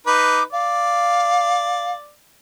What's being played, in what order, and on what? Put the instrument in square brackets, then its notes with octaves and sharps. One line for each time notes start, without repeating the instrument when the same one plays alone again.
[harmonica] D#4 B4 [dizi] D6
[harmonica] D5 [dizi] F5